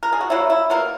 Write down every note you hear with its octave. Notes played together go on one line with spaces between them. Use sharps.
A#4
G#4
F#4
D#3 F#3 A#3 E4
E4
B2 F#3 A#3 A#4